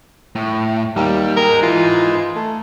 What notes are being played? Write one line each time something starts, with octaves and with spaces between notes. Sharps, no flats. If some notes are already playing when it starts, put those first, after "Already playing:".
A2
D#2 G3
D#4 G#4 A#4
E3 F4
A3